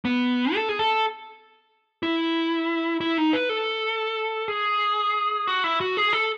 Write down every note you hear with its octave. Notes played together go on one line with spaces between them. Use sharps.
B3
A4
G#4
A4
E4
E4
D#4
B4
A4
G#4
F#4
E4
F#4
G#4
A4